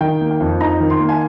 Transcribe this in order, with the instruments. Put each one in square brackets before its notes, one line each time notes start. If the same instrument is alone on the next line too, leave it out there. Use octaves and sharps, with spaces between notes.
[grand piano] D#3 G5
A#3
G5
F2
D#4 A#5
D#3
C6
A#3
G#5